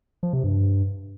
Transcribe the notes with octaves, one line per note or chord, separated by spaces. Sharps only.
F3
C3
G2